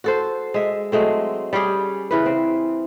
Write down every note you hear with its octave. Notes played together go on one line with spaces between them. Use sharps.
F#4 A4 C5
G#3 E5
F#3 G#3 A3 C4
G3 C#4 G4 G#4
C#3 E3 B4
C4